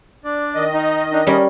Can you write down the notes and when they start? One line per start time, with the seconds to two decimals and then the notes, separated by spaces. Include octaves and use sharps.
0.24 D4 D5
0.55 D#3 D#5
0.74 D#4
1.12 D4 D#4
1.27 G3 C#4 A#4